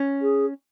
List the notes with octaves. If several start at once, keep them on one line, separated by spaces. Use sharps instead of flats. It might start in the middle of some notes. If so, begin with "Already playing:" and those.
Already playing: C#4
G#4